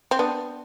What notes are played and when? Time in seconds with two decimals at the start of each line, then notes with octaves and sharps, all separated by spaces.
0.11 C4
0.19 B3 D4